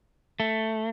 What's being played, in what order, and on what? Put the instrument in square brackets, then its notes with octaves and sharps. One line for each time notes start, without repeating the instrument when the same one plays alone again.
[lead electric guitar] A3